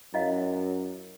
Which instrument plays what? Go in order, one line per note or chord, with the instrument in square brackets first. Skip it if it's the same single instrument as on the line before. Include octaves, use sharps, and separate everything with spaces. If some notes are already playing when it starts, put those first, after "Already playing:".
[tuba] F#2 [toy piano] E4 D#5 F5